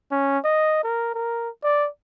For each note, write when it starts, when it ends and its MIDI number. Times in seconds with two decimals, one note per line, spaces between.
0.12 0.39 61
0.44 0.83 75
0.84 1.11 70
1.14 1.49 70
1.64 1.88 74